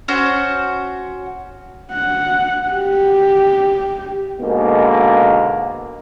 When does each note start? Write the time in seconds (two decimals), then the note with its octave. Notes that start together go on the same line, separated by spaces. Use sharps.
0.08 C#4 F#4 C5
1.92 F#5
2.69 G4
4.41 G#2 B2 D3 A#3